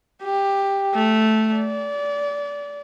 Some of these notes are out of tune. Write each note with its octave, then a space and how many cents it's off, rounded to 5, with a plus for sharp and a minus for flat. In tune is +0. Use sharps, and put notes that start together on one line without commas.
G4 +10
A3 -5
D5 -25